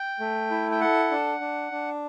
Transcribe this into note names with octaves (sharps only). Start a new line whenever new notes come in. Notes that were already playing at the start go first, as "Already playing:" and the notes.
Already playing: G5
A3
E4
G5
A4 F#5
D4
D4
D4